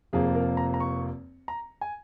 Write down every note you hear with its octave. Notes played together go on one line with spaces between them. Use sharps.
F1 F2 F3 A#3 F4 G#4
A#4
A#5
A#5
C#6
A#5
G#5